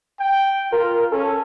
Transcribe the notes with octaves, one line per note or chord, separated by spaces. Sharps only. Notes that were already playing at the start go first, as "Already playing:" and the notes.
G5
F4 A#4
C#4 A4